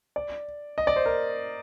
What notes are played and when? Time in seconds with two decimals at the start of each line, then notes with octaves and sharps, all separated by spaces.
0.16 D5
0.78 D#5
0.87 D5
0.96 C5
1.06 A#4